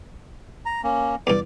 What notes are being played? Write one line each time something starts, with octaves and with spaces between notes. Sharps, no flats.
A#5
A#3 C#4
E2 G2 D5 D6